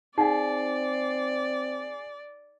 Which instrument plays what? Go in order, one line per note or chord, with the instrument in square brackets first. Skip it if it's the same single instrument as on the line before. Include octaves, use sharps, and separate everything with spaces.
[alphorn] C4 [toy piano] D#4 F#5 [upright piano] G#4 [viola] D5